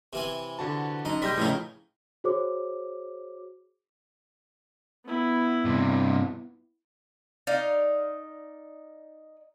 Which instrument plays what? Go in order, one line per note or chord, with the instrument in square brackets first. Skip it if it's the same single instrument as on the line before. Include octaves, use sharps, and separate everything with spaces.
[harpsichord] C3 E3 G#5
[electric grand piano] D3 F#4 A5
[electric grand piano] F#2 [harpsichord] D#4
[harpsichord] C3 G3 G#3 [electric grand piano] G6 A#6 B6
[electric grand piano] A2 C#3 [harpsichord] E3 F3 D#4
[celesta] F#4 G#4 C5 C#5 D6
[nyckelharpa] B3 E4
[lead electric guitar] G2 C3
[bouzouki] D#4 D5 F5